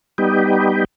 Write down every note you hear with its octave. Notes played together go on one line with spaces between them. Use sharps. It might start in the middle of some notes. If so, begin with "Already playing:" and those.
G3 B3 D#4 G4